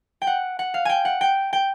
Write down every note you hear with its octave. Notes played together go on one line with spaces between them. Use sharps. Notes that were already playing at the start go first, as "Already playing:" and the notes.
G5
F#5
F#5
F5
G5 G#5
F#5
G5
G5